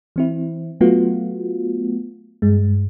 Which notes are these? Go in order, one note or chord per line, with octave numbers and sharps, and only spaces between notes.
E3 C4 E4
F#3 A3 B3 F4 F#4
G2 G#3